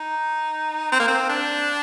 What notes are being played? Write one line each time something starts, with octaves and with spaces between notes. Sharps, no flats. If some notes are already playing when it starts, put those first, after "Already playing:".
Already playing: D#4
C4
A#3
C4
D4